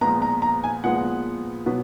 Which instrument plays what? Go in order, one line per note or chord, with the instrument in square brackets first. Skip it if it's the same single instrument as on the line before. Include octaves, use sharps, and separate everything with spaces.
[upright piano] A#2 F3 G#3 B3 A#5
A#5
A#5
G#5
A#2 F3 G#3 B3 F#5
B2 F#3 B3